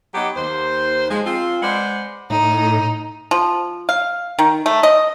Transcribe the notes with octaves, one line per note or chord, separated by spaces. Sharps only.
F#3 B3 D#4 G4
D#2 C5
F3 G#3
F3 C4 F4
G#3 B4 C5 D5 F#5
A2 D#4
F3
F5
D#3
A3
D#5